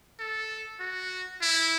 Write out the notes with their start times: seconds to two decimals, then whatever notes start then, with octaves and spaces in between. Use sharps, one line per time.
0.19 A4
0.80 F#4
1.42 E4